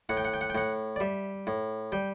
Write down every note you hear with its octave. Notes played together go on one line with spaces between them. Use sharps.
A2 F#5
G5
F#5
G5
F#5
G5
A2 F#5
D5
G3 E5
A2
G3 G5